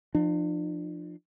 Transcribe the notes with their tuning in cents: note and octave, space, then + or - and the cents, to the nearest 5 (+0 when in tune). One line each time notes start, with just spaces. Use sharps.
F3 -5 D4 +40